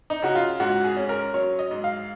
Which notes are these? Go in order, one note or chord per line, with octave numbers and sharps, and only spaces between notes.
D#4
C#3 F#4
F4
G#2 F#4
G#4
C#4
A#4
F#3 C#5
D#5
G#2
F5